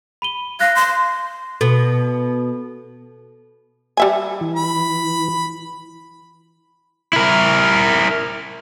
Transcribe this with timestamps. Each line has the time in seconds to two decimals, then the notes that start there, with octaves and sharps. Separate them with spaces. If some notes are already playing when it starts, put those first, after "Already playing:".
0.22 B5 D#7 G7
0.60 F5 F#6 A#6
0.76 C6
1.61 B2 A4
3.97 G3 E5 G#5
4.41 E3
4.55 B5
7.13 E4 A#4